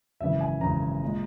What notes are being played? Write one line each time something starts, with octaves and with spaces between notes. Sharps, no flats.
G#1 F#2 C#3 E3 E5
G#5
G#1 F#2 C#3 E3 A#5
A#2 G#3